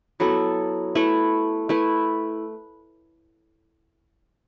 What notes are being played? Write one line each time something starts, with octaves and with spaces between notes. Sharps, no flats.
F#3 B3 E4 A4
A3 E4 B4
A3 E4 B4